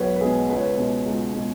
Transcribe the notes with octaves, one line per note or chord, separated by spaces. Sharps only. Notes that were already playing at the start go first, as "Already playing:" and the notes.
Already playing: B1 B2 G#3 B4 C#5
B4
B2 G#3 G#4
C#2 B4
C#5
B4
B2 G#3
C#2
B2 G#3